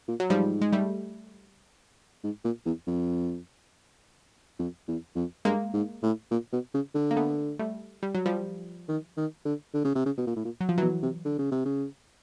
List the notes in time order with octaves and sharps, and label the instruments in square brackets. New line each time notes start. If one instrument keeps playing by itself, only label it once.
[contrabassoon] A#2
[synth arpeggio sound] F#3
[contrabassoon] G#2 [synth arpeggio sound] F3 G3
[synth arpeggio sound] G#3
G3 A3
[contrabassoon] G#2
A#2
E2
F2
F2
E2
F2
[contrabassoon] G2 [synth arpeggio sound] G#3 A#3
[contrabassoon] G#2
A2
A#2
B2
C#3
D3
[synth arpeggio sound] A#3
A3 B3
G3 A3
G3
F#3
F3 G3
[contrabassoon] D#3
D#3
D3
D3
C#3
C3
C#3
B2
A#2
A2
A#2
[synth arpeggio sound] F#3
F3
[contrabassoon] B2 [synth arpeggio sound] E3 F#3
[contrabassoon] C3
D3
C#3
C3
C#3